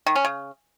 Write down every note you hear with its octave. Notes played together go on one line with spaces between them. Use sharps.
D#3
C#4
C#3